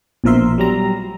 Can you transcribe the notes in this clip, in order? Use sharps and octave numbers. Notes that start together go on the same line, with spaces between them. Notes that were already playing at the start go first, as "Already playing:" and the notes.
A#1 B2 F3 A#4 E5 C6
F#3 G3 A#5